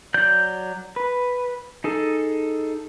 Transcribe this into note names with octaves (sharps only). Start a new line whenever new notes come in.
F#3 D5 G6
B4
D#4 G#4 A4